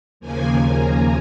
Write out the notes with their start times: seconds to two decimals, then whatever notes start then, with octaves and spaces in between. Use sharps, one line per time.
0.20 D#2 C#3 F3 A#3 G#5
0.65 A#5